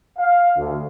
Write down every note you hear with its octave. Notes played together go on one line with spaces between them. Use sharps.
F5
D2